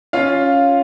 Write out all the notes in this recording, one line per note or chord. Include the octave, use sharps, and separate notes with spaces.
C#4 F4 F5